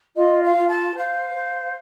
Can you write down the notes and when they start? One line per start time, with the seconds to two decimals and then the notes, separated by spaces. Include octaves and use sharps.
0.16 F4 D#5
0.43 F5
0.56 F4
0.69 A5
0.95 C5 F5
1.35 C5